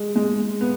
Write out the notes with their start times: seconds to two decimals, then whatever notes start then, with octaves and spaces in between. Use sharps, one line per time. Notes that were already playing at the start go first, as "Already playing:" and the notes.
Already playing: G#3
0.16 G#3
0.61 B3